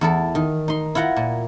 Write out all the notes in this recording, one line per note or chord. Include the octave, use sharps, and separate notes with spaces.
E2 E4 A4
D#3
D#4 C6
E4 F4 F#5 A#5
A#2